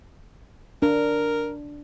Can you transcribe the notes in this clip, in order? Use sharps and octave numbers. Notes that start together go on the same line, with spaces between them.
D4 A#4